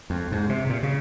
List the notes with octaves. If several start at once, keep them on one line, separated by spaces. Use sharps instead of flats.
F2
G#2
C3
A#2
C#3